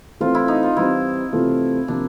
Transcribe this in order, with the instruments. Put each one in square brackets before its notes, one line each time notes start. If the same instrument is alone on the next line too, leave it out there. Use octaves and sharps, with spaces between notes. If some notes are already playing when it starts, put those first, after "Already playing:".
[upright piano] E3 A3 C4 [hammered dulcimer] F4
[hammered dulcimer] E4
D#4
F4
[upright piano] E3 G3 C4 [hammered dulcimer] E4
[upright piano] C3 E3 A3 C4 F4
[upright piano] C3 F3 A#3 [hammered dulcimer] D4